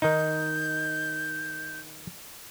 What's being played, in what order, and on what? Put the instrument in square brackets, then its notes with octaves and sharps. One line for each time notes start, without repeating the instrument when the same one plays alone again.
[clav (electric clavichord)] D#3 D#4 [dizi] G6